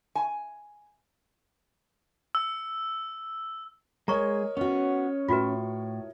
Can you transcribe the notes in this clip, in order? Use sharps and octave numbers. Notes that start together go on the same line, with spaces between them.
G#5
E6
G#3 A#4 C#5 D#5 G#5 A#5 C#6
B3 C#4 F#4
A2 F4 F#4 B4